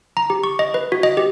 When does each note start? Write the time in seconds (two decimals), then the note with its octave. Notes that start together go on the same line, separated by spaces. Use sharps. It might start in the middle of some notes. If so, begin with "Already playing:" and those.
0.17 A#5
0.30 G4
0.43 C#6
0.59 D#5
0.74 B4
0.92 F#4
1.03 D#5
1.17 G4